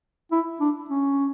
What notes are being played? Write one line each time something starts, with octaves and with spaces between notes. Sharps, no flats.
E4
D4
C#4